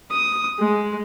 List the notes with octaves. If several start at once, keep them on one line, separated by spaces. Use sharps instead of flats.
D#6
G#3